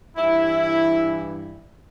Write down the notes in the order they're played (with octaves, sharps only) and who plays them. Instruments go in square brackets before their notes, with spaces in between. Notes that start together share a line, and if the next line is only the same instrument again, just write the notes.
[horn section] G2 E3 E4